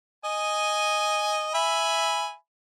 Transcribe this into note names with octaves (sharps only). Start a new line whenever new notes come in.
D#5 G#5
E5 G#5 B5